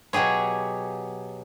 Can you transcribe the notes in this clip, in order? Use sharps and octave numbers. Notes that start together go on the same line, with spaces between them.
B2 F#3 G4 G#4 C#5